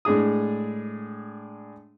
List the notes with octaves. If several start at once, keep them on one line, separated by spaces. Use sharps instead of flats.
A2 G#3 D4 G#4 D#6